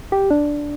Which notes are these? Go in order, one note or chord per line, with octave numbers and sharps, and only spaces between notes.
G4
D4